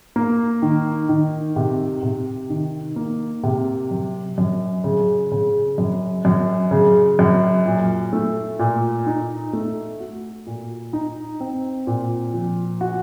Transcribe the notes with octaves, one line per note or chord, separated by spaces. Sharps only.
A#3
D#3
D#3
C3
C3
D#3
A#3
C3
F#2
F#2
C#3
C#3
F#2
F#2
C#3
F#2
A#2
A3
A#2
D#4
A3
F#4
A#2
D#4
C4
A#2
F3
F#4